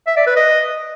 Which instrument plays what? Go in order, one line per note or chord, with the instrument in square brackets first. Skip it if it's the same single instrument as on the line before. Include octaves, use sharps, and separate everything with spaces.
[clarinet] E5
D5
B4
D#5